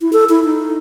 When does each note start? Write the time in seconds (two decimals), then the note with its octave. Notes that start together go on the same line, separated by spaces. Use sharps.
0.01 E4
0.13 A4
0.29 E4
0.45 D#4